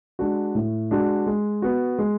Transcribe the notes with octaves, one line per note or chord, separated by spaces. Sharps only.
G#3 D4 F#4
A2
G#3 D4 F#4
G#3
B3 F#4
G#3